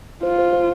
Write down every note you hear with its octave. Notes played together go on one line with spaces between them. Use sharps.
F4 C5
C5
C5